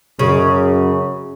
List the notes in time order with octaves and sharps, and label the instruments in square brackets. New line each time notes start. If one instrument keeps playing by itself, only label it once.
[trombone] F#2 [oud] C#3